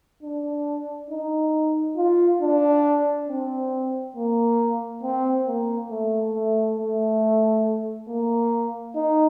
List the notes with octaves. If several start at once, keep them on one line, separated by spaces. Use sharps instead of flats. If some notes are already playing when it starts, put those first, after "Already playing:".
D4
D#4
F4
D4
C4
A#3
C4
A#3
A3
A3
A3
A#3
D#4